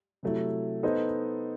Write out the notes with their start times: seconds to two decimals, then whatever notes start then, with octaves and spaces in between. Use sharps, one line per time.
0.23 C3 F#3 A3 E4
0.83 B3 D#4 A4 C5 D#5